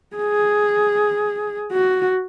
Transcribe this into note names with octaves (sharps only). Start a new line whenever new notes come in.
G#4
F#4